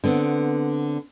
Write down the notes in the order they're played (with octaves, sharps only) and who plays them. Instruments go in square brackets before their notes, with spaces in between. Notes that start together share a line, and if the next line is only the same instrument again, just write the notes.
[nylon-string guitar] D3 B3 C4